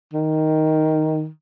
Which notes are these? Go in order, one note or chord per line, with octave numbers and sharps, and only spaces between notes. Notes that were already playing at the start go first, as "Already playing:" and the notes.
D#3